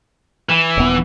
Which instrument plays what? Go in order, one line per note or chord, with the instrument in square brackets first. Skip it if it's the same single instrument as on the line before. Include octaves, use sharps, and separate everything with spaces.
[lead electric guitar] E3
[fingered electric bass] D#1 B3